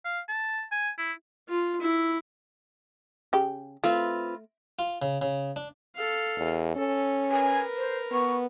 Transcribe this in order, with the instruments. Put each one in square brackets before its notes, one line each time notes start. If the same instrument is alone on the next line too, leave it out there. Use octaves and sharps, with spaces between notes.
[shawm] F5
A5
G#5
E4
[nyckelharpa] F4
E4
[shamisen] C#3 G4
[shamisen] A3 [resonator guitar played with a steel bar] C4 F4 B4
[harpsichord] F4
C#3
C#3
D4
[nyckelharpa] A4 F5
[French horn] E2
[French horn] C#4 [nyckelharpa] A4
[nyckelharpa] A#4 B4 [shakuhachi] G#5
[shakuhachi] C5
[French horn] B3 [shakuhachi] C#6